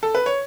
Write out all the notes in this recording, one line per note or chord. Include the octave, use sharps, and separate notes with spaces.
A4
B4
C#5